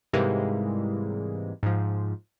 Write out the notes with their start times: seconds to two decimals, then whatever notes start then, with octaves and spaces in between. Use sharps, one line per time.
0.13 G#2 C3 E3 G3 G#3 A#3
1.63 G#2 F3